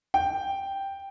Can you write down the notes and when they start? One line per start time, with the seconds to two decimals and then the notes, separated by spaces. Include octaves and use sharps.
0.14 G5